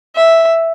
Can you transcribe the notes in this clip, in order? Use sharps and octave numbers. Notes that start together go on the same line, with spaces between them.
E5